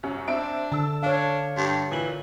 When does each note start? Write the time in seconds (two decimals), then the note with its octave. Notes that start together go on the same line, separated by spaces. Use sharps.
0.03 C2 F#2 C#4
0.28 C4 D4 E5 D7
0.72 D3 A5 E6
1.03 D4 C#5 F5
1.57 G2
1.91 A#2 E3 F#7